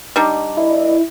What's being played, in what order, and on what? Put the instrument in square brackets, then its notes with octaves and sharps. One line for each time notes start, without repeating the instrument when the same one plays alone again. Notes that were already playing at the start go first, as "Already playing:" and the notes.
[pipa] G3 D4 D#4
[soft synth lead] E4 [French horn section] B4 D5 D#5